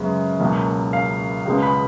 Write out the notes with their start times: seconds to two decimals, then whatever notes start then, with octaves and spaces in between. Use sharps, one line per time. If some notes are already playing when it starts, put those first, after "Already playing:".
Already playing: F#2 C#3 G#3 B3
0.40 C#2 B2 F#3 A#3
0.93 F5
1.46 C#2 C#3 G#3 B3
1.63 B5